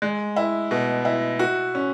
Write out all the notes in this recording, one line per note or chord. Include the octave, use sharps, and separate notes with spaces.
G#3
E4
B2
E4
F#4
C#4